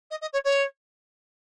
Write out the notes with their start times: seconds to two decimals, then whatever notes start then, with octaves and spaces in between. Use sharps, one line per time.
0.10 D#5
0.21 D#5
0.33 C#5
0.44 C#5